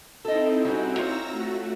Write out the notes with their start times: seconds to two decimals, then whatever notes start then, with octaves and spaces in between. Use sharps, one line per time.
0.25 C4 D#4 E4 A4 D#5
0.65 G3 C#4 F#4
0.98 C4 F4 C#5 A#5 E6 A#6
1.29 A3 F#4